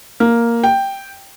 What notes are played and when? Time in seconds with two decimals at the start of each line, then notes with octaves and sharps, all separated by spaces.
0.20 A#3
0.64 G5